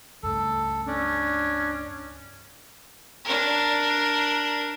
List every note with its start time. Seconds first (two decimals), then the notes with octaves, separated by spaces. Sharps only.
0.23 C#2 G2 A3 A4
0.87 C#4 D4
3.24 D4 A#4